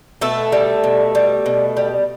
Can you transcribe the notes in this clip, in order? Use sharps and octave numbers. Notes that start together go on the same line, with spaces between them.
B2 A3 A4
G3
B2
G3
B2
G3